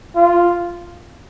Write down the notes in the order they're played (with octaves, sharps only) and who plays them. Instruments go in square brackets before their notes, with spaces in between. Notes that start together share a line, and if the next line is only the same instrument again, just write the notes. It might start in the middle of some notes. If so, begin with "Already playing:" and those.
[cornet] F4